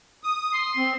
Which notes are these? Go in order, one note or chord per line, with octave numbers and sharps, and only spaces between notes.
D#6
C6
C4